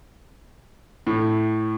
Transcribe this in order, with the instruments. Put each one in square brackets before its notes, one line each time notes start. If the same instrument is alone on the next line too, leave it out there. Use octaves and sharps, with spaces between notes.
[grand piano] A2